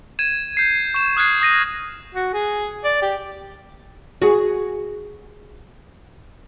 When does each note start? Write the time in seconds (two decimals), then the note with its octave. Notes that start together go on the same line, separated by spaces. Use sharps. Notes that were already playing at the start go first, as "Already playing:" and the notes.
0.19 G#6 D#7 E7
0.57 G6 C7
0.94 C#6 E7
1.17 D#6 F6 F#6 G#6 C7
1.42 D#6 A#6 D#7
2.14 F#4
2.34 G#4
2.85 D5
3.02 G4
4.22 F#4 G#4